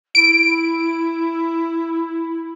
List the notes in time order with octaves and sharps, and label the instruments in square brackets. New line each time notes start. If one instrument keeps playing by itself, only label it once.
[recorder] E4 [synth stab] D7